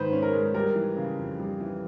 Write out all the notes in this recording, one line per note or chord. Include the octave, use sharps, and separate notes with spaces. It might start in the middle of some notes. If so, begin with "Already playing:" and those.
Already playing: G#2 D#3 G#3 B4 C5
C#4
A#4
G#3
G3 A#4
E3
C#3
F2
G3
E3